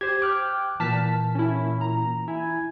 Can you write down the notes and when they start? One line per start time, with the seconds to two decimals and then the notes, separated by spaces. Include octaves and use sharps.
0.01 G4 C5 G#6
0.22 G5 D6 F6 F#6
0.80 A#2 E3 A5 F6 B6
1.35 C#4 E4
1.81 A#5
2.28 E4 G#5